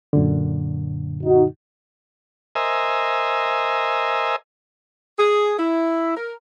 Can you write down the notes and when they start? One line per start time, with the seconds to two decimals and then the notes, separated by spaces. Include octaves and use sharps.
0.13 F#2 A#2 D3
1.24 D#4 F#4
2.55 A#4 C5 D#5 E5 G#5
5.19 G#4
5.59 E4
6.17 A#4